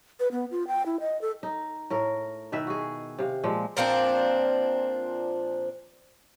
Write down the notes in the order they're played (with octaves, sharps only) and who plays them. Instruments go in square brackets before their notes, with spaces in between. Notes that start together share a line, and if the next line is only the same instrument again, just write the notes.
[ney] B4
B3
F4
G5
E4
D#5
A4
[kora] D#4
A2 A#4
B2 D#3 B4 E5
F#4 G#4
C3 F5
A#2 F3 G#3
[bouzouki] A#2 F3 C4 D4